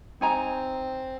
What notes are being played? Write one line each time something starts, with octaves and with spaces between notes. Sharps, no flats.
C4 D#4 G#5 A#5